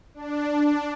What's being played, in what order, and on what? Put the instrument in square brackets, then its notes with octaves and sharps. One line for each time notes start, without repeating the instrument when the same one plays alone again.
[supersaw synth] D4